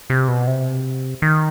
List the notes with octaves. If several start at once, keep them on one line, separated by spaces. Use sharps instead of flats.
C3
B2
C3
D#3